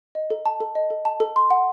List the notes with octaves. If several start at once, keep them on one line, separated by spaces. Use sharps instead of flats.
D#5
A4
A5
A4
D#5
A4
A5
A4
C6
F#5